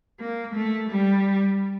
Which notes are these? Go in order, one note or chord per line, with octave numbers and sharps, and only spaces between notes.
A#3
A3
G3